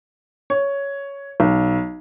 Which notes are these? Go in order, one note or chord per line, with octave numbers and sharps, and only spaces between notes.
C#5
B1